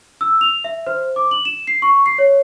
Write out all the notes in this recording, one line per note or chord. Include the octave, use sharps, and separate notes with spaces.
E6
F7
E5
C5
D6
F#7
E7
C7
C#6
C7
C#5